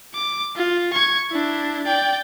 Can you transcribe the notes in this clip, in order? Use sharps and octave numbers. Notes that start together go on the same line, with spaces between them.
D6
F4
C#6 G#6
D4 E4
D5 G5